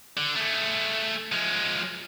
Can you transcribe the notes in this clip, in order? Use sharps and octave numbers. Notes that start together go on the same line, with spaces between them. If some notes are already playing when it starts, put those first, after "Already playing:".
D3
A3 G#4
F3 G#3